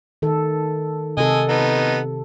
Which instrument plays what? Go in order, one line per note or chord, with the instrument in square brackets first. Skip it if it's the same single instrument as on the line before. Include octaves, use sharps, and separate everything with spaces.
[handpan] D#3 A4
[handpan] C3 A4 [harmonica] D#5 G#5
[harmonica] B3 D#4